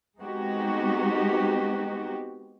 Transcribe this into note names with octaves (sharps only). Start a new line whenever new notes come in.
G#3 B3 C4 D#4 F#4 G4